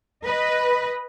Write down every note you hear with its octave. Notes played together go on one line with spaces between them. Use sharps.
B4 D#5